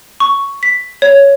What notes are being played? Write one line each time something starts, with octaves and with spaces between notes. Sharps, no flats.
C#6
B6
C#5